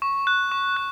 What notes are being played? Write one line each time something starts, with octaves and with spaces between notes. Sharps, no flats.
C#6
F#6
C#6
F#6